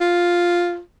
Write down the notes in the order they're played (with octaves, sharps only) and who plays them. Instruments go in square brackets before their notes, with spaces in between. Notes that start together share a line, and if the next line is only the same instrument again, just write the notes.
[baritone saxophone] F4